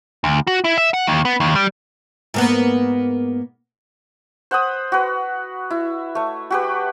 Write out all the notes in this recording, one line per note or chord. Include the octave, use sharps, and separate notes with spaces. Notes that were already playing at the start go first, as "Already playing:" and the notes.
D2
F#4
E4
E5
F#5
D#2
B3
D#2
G3
G#2 A#3 B3
C5 F#5 B5 D#6
F#4 B4
E4
A3 C#5
F#4 G4 B4